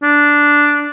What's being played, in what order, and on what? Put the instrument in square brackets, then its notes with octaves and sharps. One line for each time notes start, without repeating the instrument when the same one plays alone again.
[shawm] D4